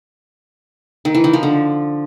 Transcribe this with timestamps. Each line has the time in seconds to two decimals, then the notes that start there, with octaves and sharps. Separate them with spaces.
1.05 D#3
1.15 E3
1.24 D#3
1.33 F3
1.43 D3